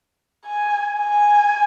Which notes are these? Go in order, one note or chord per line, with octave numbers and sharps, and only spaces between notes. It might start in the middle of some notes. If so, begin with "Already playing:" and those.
G#5
G#5